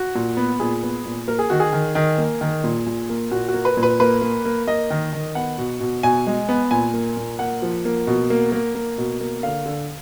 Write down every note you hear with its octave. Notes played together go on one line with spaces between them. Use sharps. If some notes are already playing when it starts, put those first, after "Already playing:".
Already playing: F#4
A#2
B3
A#2 G#4
B3
A#2
A#3 A#4
G#4
D#3 F#4
G#4
D#3
D#3
A#3
D#3
A#2
A#2
A#3
A#2 F#4
F#4
A#3
B4
A#2
B4
A#3 B4
A#3
A#3
A#3 D#5
D#3
D#3
B3 F#5
B2
B2
B2 G#5
G#3
B3
A#2 G#5
A#3
A#2
A#3 F#5
F3
A#3
B2
A#3
A#3
A#3
B2
A#3
D3 F5
D3